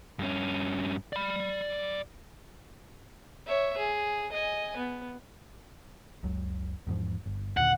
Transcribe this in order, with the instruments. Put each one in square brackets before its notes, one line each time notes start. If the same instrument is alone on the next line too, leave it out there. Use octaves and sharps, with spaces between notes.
[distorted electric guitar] G2 C#4
D5 B5
[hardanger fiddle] C#5 E5
G#4
D#5 G#5
B3
[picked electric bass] F#1 C#2 F#3
E2 G#2 F3
G1
[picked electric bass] D#2 A#2 D3 [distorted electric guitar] F#5